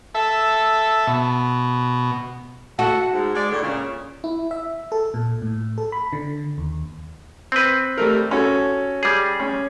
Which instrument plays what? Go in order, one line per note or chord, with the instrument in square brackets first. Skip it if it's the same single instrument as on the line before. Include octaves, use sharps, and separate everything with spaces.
[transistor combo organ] A4 E5
B2
[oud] F#4 [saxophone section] A4 E5 F#5
[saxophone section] G#2
G#3 D5
A2 D3
A#2 C#3
[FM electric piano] E4
E5
A4
A#2
A2
A4
B5
D3
D#2
[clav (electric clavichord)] C4 B4
[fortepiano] G3 A3 A#4
C#4 F#4 A4
[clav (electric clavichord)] G3 G#4
[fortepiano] C#4